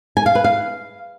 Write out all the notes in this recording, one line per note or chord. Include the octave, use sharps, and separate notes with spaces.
G#5
F5
B4
F5